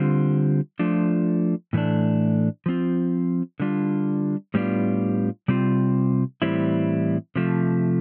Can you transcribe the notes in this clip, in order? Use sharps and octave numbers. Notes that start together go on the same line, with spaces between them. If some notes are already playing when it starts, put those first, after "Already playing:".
Already playing: D3 G3 C4 F4
F3 A3 D4 F4
A2 E3 A3 D4
F3 C4 F4
D3 G3 D4 F4
A2 G3 B3 D4 F4
C3 G3 C4 F4
A2 E3 G3 C4 E4
C3 F3 A3